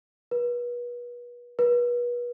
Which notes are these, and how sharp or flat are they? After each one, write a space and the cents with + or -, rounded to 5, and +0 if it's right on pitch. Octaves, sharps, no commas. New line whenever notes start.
B4 -35
B4 -35